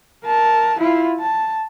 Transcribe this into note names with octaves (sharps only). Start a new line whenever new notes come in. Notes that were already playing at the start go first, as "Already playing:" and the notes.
A#4 A5
E4 F4
A5